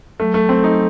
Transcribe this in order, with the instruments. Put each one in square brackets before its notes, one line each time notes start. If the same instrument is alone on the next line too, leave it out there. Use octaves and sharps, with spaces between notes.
[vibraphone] F#3 [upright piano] A3
[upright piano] A3
[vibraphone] A3 [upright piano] C4
[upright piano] D#4